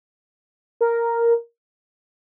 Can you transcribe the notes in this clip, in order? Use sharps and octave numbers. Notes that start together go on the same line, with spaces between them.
A#4